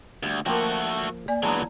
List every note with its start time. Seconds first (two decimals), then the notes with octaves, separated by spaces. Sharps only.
0.23 D2 G3
0.46 F3 A3 A#3 F#4 A#4 G5
1.28 A#3 D5 G#5
1.43 E3 F#3 G#3 B3 D4 A5 A#5